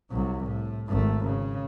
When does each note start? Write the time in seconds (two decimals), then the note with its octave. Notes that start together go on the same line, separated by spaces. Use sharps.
0.11 C2 F#3
0.44 A2
0.88 G#1 A3
1.25 C#3